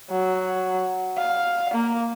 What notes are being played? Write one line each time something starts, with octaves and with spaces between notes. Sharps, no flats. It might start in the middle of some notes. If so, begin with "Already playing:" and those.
F#3
F5
A#3